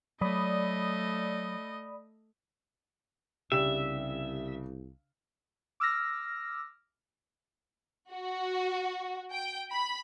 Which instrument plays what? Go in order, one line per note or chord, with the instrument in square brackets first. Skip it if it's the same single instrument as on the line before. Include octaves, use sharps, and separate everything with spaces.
[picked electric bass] F#3 [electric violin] A3 D#5 [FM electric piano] D5 B5 D#6
[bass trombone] C2 [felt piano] C#3 D4 [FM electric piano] G4 [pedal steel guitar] E5
[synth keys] D6 E6 F6 A#6
[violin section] F#4
G5
B5